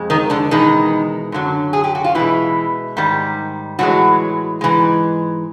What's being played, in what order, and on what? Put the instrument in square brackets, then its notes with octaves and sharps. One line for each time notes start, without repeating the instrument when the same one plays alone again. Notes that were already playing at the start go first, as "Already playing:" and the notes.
Already playing: [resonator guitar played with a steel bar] F2 G#3
D#3 D#4
D3 D4
E2 B2 D#3 G#3 D#4
F#2 D3 F#3
G#4
G4
F#4
F4
B2 E3 G#3 E4
G#2 D#3 G3
A2 E3 F#3 G#3 F#4
G#2 E3 G#3